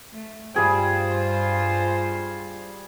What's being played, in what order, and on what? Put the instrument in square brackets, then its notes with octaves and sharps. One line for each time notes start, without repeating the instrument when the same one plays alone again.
[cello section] A3
[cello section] G2 F4 C5 [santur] G3 G#4 G5